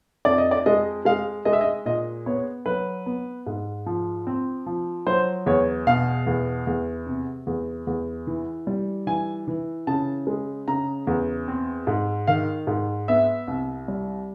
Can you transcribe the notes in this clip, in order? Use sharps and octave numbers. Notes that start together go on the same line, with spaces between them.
F2 D5
D#5
D5
G#3 D#5
G#3 F5
G#3 D#5
E5
D#5
A#2 D#5
B3 C#5
F#3 B4
B3
G#2
F3
C4
F3
F#3 C5
E2 C#5
B2 F5
E2
E2
C3
E2
E2
E3
G3
E3 G#5
E3
C#3 A5
G#3
C#3 A#5
E2
C4
G#2
D#3 F5
G#2
B3 E5
C2
G3